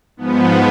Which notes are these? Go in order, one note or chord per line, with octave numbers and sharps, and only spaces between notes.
G#2 F3 B3